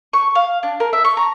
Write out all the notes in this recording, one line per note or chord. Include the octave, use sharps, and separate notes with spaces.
C#6
F5
D4
A#4
E5
C#6
A#5